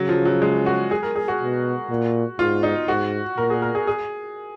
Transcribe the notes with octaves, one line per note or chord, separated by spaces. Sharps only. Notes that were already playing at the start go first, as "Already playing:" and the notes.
Already playing: C#3 F#3
F3
F#3
G#3
F#4
G#4
A#4
G#4
F#4
B2
A#2
G#2 F4
D#4
G#2 F#4
A#2 A#4
G#4
A#4
G#4
G#4